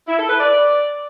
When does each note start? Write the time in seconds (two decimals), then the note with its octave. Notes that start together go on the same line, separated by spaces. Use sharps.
0.08 E4
0.18 A4
0.29 B4
0.39 D5